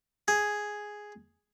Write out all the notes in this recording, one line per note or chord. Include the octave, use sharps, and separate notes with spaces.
G#4